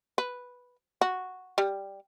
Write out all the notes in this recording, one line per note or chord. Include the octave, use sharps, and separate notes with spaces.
B4
F#4
G3